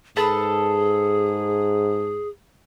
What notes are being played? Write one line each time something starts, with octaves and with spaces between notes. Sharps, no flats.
G#2 G#4 A4 B4 A5